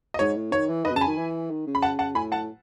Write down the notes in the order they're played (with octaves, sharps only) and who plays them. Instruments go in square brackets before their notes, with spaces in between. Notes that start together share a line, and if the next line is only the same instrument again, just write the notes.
[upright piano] D#5
[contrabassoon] G#2 [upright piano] C#5
[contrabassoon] A2
[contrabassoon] D#3 [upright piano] C#5
[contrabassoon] E3
[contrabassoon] D#3 [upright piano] B4 D#5
[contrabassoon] B2
[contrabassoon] C#3 [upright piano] A5
[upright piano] G#5 B5
[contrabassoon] D#3
E3
D#3
C#3
[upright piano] B5
F#5 A5
F#5 A5
[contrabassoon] A2 [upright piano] G#5 B5
[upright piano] F#5 A5